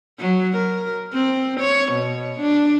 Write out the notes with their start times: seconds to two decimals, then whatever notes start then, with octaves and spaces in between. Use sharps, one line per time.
0.20 F#3
0.57 A#4
1.13 C4
1.60 C#5
1.92 B2
2.40 D4